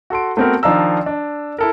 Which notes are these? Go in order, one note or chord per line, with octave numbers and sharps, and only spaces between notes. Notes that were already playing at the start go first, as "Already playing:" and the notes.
F#4 A4 C6 D7
A3 B3 C4 F#4 A#4
D#3 F3 D4 F5 A#5 E6
D4
E4 A4 A#4